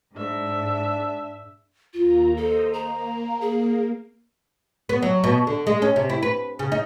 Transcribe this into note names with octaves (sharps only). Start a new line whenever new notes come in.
G#2 D4 E5
D#2 A#3 F4 A#5
A4 C5 D#5
A#3 A#5
G#4
B3
F#3
B2
D3
G#3
C#4
C3
E4
B4
C#3
D#4